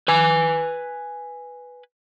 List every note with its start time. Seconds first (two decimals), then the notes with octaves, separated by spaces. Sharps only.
0.08 B4 G#5